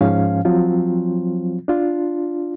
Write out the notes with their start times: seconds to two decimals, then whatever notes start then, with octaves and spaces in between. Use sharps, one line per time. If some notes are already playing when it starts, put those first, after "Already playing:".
0.01 G#2 F3 C#4 F5
0.45 F3 F#3 C4 F4
1.68 D4 F4